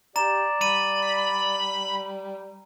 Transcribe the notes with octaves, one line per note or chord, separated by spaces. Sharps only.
G4 D5 A#5 E7
G3 B5 D#7